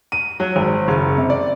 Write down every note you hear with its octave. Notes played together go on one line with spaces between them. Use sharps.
D#7
F#3
G#1
F#1
C3
D5